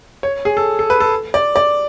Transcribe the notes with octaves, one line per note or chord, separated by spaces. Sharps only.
C#5
G#4
A4
A4
B4
A4
D5
D5